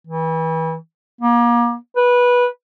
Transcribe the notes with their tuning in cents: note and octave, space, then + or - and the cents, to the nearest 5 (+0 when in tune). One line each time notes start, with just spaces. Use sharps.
E3 -30
A#3 +35
B4 -15